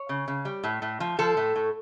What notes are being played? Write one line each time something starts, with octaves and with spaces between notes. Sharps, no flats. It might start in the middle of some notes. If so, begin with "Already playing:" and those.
Already playing: C#5
C#3
C#3
G3
A2
A2
F3
F3 A4
A2
A2